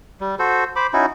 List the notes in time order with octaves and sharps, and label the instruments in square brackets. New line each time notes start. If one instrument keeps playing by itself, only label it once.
[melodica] G3
F#4 A4 C5
C5 B5 D6
C#4 D#4 E4 F#4